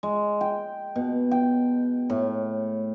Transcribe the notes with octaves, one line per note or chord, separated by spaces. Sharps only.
G#3
G5
B2
G5
A2